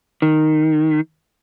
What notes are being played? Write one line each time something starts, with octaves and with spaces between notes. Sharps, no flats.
D#3